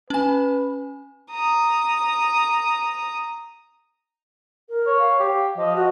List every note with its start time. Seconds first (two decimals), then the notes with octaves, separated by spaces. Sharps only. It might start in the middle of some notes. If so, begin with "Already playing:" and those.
0.10 C#4 B4 G#5
1.31 A#5 D#6
4.69 A#4
4.87 C#5
4.99 F5
5.20 G4
5.57 F3 D#5
5.75 F#4